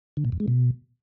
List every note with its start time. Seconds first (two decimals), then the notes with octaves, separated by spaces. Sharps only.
0.17 D3
0.25 A#2
0.32 F2
0.40 G#3
0.48 B2